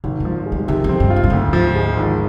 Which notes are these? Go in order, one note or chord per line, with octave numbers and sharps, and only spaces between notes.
G#1 C3
F3 G#3
G#3
G3
C3 D#3
F2 C4
G2
F4
G#2
G2
D2 G#2
F3
G#3
G#1